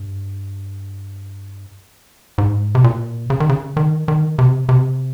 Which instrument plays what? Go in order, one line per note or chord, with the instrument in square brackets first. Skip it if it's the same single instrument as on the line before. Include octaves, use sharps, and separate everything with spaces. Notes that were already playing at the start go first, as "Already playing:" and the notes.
Already playing: [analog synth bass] G2
G#2
C3
A#2
C#3
D#3
C#3
D#3
D#3
C3
C3